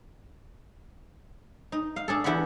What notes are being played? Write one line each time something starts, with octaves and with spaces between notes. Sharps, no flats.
D#4
F5
D4 G#4 A4
E2 E4 G4 F#5 B5